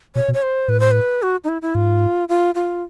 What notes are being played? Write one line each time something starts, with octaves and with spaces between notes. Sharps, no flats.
B2 C#5
B2
C#5
C5
A2 B4
C5
B4
F#4
D#4
E4
E4
G#2 F4
F4
F4